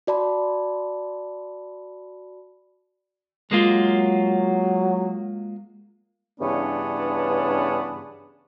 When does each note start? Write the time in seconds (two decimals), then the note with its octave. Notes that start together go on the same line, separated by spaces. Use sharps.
0.07 F#4 D5 A5 B5
3.51 F#3 G#3 A#3 F4
6.41 G2 C#3 E3 B3 C#4 D4